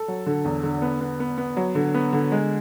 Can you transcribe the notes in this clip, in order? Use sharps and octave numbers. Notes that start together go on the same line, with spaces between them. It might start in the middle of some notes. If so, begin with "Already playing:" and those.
Already playing: A4
F#3
D3
E2
D3
B3
B3
B3
B3
F#3
D3
B3
D3
G#3